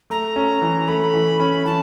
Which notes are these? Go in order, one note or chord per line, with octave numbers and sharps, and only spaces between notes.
A3 A#5
C#4
E3
A3 B5
E3
C#4
E3 A5